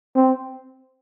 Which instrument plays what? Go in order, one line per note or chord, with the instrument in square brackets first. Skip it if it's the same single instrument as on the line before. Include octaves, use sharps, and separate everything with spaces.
[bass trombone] C4